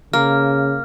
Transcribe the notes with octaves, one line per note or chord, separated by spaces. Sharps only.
C#3 A#3 F6